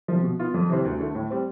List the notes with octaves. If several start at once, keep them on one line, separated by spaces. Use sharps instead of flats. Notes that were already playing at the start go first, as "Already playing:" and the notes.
C3 F3
B2
B3 F4
F2
C3 E3 G3 C4
D2
D3 A3
A2
G3 C4